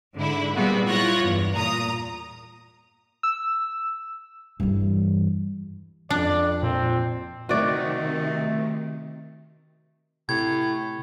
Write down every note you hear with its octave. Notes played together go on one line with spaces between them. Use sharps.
G#2 D3 E4
A#2 G3 G#3 B3 C4 F#4
F#3 E4 F4 C#5 F#6 A#6
E2 G2
A#2 A#5 D#6
E6
G2 E3
F2 D4 D5
A#2 C4
C3 D#3 A3 F#4 D5
A2 C3 G#6